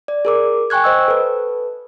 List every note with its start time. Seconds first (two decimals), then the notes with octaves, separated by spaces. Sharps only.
0.08 D5
0.25 G#4 A#4 D6
0.70 G5 G#5 C#6 F#6 G#6
0.84 C5 D#5 E6
1.08 A4 B4